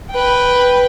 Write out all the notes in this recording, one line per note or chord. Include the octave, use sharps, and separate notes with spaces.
B4 G5